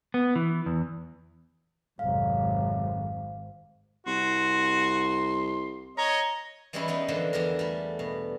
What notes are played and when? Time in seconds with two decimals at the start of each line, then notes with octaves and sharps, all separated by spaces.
0.14 B3
0.36 E3
0.66 E2
1.99 G#1 F2 C3 F#3 F5
4.07 C2 F#4 C6
5.98 C#5 D#5 A#5
6.73 E3 G3 G#3 C#4 D#4 E4
6.88 G#3 B3 D#4
7.08 D3 E3 F3 G3 A#3
7.33 E2 G3 D4 A#4
7.59 G3 A3
7.99 B2